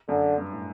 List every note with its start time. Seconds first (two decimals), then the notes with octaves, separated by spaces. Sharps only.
0.09 F#2 D3
0.38 G2
0.52 A2